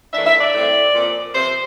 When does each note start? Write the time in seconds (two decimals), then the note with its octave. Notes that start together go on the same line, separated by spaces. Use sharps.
0.13 A2 E3 A#3 D4 E5
0.27 E5
0.41 D5
0.54 A2 G3 C4
0.94 A#2 F3 C4
1.34 C3 F3 C4 C5